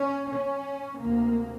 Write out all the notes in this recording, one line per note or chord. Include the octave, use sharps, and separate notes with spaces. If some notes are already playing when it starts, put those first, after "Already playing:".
Already playing: C#4
C#4
D2 C3 A#3